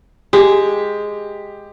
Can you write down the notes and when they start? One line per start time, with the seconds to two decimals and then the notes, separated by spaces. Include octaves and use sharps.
0.33 G#3 G4